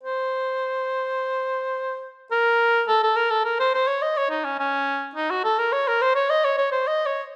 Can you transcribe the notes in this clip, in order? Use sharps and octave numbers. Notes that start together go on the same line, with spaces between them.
C5
A#4
A4
A4
A#4
A4
A#4
C5
C5
C#5
D#5
C#5
D#4
C#4
C#4
D#4
F#4
A4
A#4
C#5
A#4
C5
C#5
D#5
C#5
C#5
C5
D#5
C#5